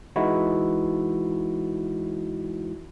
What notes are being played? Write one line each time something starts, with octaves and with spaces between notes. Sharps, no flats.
E3 G#3 D#4 E4 F#4